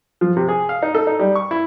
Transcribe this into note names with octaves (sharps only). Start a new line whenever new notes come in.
F3
C3
G#4
F5
D#4
A4
D#4
G3
C#6
E4